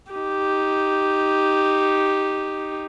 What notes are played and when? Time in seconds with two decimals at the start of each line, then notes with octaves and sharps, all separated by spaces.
0.12 D#4 G4